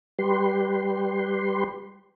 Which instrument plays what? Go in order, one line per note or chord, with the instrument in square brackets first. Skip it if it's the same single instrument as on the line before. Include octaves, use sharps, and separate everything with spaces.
[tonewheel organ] G3 G4 B4 C6